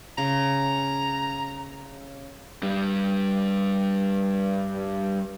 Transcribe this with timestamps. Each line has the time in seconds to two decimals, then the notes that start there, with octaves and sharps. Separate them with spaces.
0.18 C#3 C#4 A#5
2.63 G2 G3